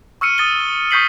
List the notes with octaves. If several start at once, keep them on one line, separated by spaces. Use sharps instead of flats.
C#6 E6 F6 C#7 D#7
D#6 A6 D#7 G7
C#6 D#6 G6 B6 C7 F#7